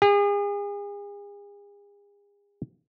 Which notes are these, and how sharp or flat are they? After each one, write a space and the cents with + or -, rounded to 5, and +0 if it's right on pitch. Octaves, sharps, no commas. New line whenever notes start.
G#4 -40